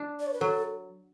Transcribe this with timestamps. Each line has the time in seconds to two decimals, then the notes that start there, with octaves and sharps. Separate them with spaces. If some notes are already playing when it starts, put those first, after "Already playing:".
Already playing: D4
0.20 D5
0.26 C#5
0.33 B4
0.41 F#3 A4